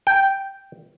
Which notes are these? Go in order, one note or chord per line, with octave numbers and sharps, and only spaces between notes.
G5